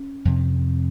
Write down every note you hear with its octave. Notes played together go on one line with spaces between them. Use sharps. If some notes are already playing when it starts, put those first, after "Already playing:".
Already playing: C#4
F2 C3